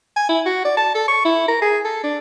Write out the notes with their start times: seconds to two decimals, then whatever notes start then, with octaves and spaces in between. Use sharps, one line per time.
0.16 G#5
0.29 E4
0.46 F#4
0.65 D5
0.77 A5
0.95 A4
1.08 C#6
1.25 E4
1.48 A#4
1.62 G#4
1.85 A4
2.03 D4